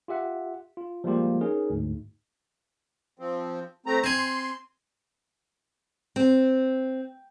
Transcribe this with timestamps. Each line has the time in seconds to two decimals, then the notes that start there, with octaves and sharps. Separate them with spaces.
0.08 F4 G4 E5 F#5
0.77 F4
1.04 F3 G3 G#3 A#3 F4 G4
1.41 C#4 D#4 G#4 A#4
1.70 D2 G#2
3.19 F3 C4
3.86 A3 C4 A#5
4.04 C4 G#5 C6
6.16 C4